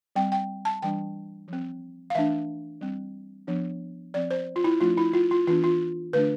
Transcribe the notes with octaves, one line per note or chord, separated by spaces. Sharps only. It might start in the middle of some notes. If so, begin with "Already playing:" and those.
G3 C4 G5
G5
A5
E3 G3 D4 G5
F3 C4
F5
E3 A3 D4 E5
G3 C4
F3 B3 D4
F3 C4 D5
C5
F4
E4
F3 A3 D4 F4
E4
F4
F4
E3 B3 D4 F4
F4
D3 A3 D4 B4